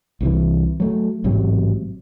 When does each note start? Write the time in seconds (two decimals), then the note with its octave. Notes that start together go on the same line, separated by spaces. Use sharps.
0.21 C2 C3 E3
0.80 F#3 A3
1.24 A1 G#2 C3 F#3